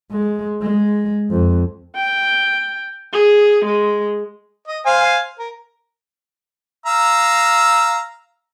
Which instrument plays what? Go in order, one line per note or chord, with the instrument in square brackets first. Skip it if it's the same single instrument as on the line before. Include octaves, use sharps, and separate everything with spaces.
[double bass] G#3
G#3
F2
[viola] G5
G#4
G#3
[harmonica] D#5
C5 F5 G#5
A#4
F5 A#5 E6